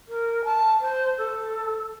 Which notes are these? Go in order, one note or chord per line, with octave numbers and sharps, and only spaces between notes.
A#4
A5
C5
A4